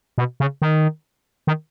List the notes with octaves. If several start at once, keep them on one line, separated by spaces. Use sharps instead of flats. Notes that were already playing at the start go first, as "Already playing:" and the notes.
B2
C#3
D#3
D#3